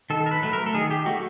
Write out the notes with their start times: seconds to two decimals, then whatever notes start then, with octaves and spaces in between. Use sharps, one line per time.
0.10 D#3 A4
0.26 A#4
0.31 B4
0.42 F#3 A3 B4
0.53 A#4
0.66 A4
0.74 D#3 G#4
0.91 G4
1.06 F#3 A3 F#4